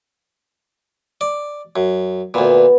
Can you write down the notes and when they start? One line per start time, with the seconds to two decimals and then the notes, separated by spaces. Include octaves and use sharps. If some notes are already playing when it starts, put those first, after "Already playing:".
1.21 D5
1.76 F#2
2.34 D2 A#2 B3